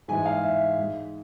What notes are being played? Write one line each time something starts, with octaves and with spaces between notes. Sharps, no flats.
G#2 E3 G#3 G#5
F5
E5
G#2 G#3